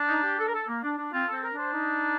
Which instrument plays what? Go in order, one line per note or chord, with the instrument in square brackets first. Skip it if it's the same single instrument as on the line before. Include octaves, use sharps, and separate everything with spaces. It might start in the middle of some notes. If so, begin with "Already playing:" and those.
Already playing: [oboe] D4
[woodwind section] D#4
G4
A4
A#4
A4
A#3
D4
D4
[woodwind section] C4 [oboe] F4
[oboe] C4 [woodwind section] A4
[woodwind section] A#4
[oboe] D4
[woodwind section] C5
D#4